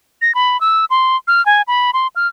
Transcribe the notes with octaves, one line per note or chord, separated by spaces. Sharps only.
A#6
B5
E6
C6
F6
G#5
B5
C6
F6